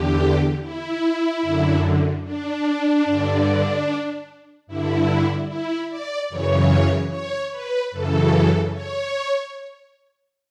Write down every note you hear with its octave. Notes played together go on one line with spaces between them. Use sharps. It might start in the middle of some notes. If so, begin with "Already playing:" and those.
Already playing: E2 D3 G4
E4
F#2 D3
D4
G2 D3
G2 D3 E4
E4
D5
F#2 C#3 E3 C#5
C#5
B4
F#2 C#3 E3 A4
C#5